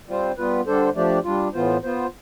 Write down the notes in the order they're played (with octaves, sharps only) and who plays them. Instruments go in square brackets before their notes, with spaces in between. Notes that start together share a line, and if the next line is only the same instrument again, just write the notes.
[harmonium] G3 C4 F4 C5
G3 B3 F4 B4
D3 G3 D4 A4 C5
F3 A3 D4 G4 D5
G3 D4 F4
A2 E3 B3 F4 C5
B3 F4 C5